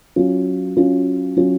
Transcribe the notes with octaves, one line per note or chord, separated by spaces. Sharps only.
F#3 C#4 F4
F#3 C#4 F4
F#3 C#4 F4